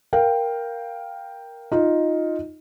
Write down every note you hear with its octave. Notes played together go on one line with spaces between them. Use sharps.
A#4 F5 G5
D#4 F4